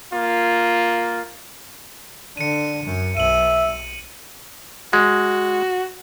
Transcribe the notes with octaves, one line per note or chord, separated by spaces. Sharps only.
A#3 F4
D3 C#7 D#7
F#2
B1 E5 D#7 F#7
G#3 F#4